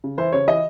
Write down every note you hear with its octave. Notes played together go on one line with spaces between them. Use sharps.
C#3
E3 C5
C#3 C#5
E3 D#5